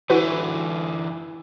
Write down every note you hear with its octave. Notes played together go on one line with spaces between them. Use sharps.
D3 E3 E4 F#4 B4